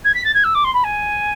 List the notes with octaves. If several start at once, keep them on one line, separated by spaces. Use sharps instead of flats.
G#6
B6
A6
G#6
E6
D6
C6
B5
G#5